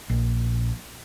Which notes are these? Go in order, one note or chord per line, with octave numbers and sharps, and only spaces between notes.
A#1